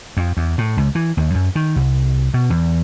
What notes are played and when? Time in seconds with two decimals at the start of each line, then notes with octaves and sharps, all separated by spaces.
0.17 F2
0.37 E2
0.58 A2
0.77 C#2
0.95 E3
1.17 D#2
1.35 F#2
1.55 D#3
1.76 C2
2.34 B2
2.50 E2